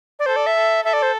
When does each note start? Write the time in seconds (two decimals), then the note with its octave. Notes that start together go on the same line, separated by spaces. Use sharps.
0.19 D5
0.26 A4 C5
0.36 D5
0.46 E5
0.56 A4
0.85 A4 E5
0.93 D5
1.02 C5